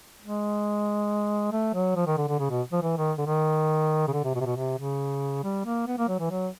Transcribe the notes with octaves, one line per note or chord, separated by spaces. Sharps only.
G#3
A3
F#3
F3
D#3
D3
D3
C#3
B2
F3
E3
D#3
D3
D#3
C#3
D3
C3
B2
C3
B2
C3
C#3
G3
A#3
B3
A#3
F#3
E3
F#3